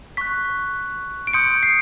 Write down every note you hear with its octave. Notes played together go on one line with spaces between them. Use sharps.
C#6 F#6 B6
D7
C6 D#6 G6 C#7
C7